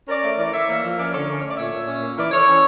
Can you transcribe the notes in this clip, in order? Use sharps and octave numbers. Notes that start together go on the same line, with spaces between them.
C#4 A#4 D5
A3
E3 A#4 D5
E3 C#5 E5
A#3
F3
C#4 A#4 D5
D3 A4 C#5
C#4 A#4 D5
A3 C#5
D5
A#2 C#5 E5
A#2
C#4
A#3
E3 A#4 D5
E3 A4 C#5
C#4